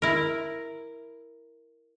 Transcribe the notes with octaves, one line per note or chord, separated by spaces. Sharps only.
E4 A#4